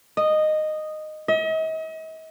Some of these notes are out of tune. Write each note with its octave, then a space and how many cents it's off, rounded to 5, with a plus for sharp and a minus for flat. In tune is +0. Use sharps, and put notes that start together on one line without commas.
D#5 -10
D#5 +45